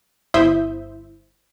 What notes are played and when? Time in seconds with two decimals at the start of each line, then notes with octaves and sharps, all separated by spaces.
0.34 G1 E4 C5 E5 D#6 G6